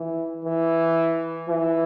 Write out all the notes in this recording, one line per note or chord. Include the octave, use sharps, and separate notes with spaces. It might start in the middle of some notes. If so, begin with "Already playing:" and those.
Already playing: E3
E3
E3